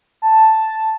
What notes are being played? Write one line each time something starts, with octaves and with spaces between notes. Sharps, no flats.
A5